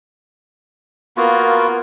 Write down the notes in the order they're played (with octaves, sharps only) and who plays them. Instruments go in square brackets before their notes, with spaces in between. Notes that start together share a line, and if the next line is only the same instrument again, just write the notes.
[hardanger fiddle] A#3 [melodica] B3 F4 F#4